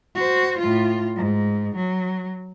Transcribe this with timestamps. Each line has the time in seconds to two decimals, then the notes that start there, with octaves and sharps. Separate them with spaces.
0.15 F#4 C5
0.59 A2 F4
1.16 G#2
1.76 F#3